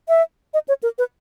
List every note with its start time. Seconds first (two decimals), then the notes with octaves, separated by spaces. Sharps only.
0.08 E5
0.54 D#5
0.68 C#5
0.83 A#4
0.98 B4